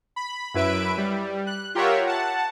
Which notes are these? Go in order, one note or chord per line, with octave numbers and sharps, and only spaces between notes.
B5
F#2 E4 B4 E5 D7
G3
F#6
F4 G4 A#4 C#5 E5 F#5
F#5 A5